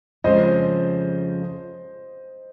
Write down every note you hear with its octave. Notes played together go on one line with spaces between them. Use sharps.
F2 C#3 F3 G#3 C5 D#5